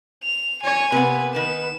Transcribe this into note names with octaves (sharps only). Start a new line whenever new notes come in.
F7
C#5 G#5
C3 A#3 B3 B4
D#3 B3 B4 E7